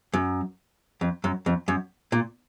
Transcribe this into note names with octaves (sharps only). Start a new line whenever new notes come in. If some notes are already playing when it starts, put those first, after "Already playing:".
F#2
F2
F#2
F2
F#2
A#2